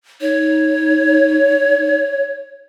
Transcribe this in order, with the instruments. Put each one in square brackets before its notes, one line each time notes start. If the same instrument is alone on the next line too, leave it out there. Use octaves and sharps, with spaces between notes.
[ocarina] D#4 [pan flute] C#5